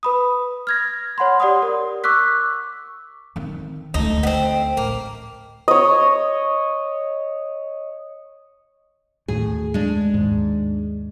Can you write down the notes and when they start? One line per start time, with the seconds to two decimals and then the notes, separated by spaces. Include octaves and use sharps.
0.03 B4 B5 D#6
0.67 F6 G#6 A#6
1.18 C#5 F#5 B5 C6
1.40 G4 D5 F#5 C6 D#6
1.63 A#4
2.04 C#6 D6 E6 F#6 B6
3.36 D#3 C4
3.94 D2 A3 D#4
4.23 B3 C4
4.77 A1 A#3
5.68 C#5 D#5
9.28 D#2 A2 G#4
9.74 G#3 D4
10.14 D#2 G#2